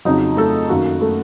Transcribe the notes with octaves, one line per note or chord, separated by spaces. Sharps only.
F2 C#3 F#3 D#4 D#5
A3 A4
F#2 D#3 A#3 F#4
A3 A4